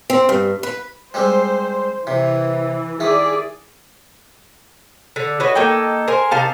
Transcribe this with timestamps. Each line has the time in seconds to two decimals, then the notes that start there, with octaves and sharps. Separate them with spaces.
0.10 C4
0.29 G2
0.63 B4
1.14 G3 G#3 C4 C5
2.07 C3 E3
3.00 D#3 E4 G#4 D5
5.16 D3
5.40 F#4 B4 C#5 D#5
5.55 A#3 D#4 A4 G5
6.08 A#4 C5 G#5
6.31 C3 D#4 F5 A5